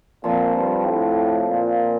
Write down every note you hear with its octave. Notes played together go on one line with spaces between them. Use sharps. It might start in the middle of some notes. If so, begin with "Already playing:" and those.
A#2 F3 C4 F4
G2
A2
A#2